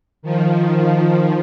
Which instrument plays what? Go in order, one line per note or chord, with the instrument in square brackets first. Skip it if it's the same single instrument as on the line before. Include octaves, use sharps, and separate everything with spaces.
[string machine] D#3 F3